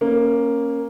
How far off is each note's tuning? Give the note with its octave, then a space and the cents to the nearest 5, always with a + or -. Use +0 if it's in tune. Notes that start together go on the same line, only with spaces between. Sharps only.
A#3 +0 C#4 -15